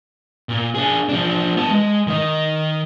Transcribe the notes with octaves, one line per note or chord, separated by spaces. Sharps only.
A#2
D4 G#4
F3 D4
B3 A5
G#3
D#3 D#5